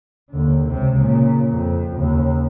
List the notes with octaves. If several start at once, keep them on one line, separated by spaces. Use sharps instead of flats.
D#2 D3
C#2 C3
A#2 C#3
F2
D#2 C#3